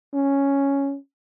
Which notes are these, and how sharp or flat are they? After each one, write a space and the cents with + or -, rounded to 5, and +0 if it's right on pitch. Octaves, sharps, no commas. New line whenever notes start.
C#4 +0